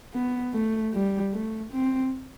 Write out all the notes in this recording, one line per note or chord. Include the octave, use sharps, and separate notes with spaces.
B3
A3
G3
A3
C4